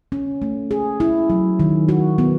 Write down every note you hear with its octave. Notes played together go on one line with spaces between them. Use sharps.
C#4
A3
G#4
E4
F#3
D#3
F#4
B3